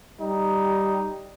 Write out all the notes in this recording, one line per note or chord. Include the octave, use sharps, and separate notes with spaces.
G3 D#4